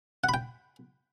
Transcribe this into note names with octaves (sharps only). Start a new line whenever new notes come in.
F#5
B5
G5